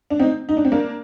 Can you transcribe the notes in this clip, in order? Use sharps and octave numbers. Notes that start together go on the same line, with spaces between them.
D4
C4 D#4
D#4
D4
C4
A#3 D4